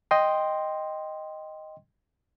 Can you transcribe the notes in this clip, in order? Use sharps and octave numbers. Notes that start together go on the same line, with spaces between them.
D#5 G5 C6